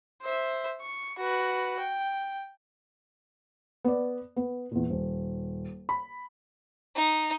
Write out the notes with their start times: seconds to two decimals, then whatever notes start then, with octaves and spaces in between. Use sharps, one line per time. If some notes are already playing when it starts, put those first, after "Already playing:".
0.22 C5 E5
0.81 C#6
1.19 F#4 B4
1.79 G5
3.84 B3 D5
4.36 B3
4.71 E2 A#2
4.90 D#1
5.89 B5
6.96 D#4